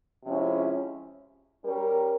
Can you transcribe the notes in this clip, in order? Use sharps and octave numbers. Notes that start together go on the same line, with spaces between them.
C3 F3 G#3 C#4 E4
G3 C#4 G4 A#4